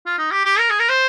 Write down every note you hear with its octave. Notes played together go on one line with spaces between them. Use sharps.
F4
D#4
G4
G4
A#4
G#4
A#4
C5